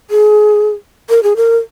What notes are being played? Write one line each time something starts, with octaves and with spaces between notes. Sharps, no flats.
G#4
A#4
G#4
A#4